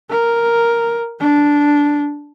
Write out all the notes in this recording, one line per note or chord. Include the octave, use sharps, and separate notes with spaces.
A#4
D4